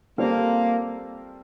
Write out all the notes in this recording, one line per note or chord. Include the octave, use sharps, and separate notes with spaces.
G3 A#3 C4 F4 A4 C5